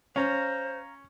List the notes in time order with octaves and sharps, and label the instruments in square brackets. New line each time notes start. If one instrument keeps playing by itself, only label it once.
[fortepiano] C#4 [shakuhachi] C5 [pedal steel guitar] F5 A#5